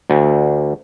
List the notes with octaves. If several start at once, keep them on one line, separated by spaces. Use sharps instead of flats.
D2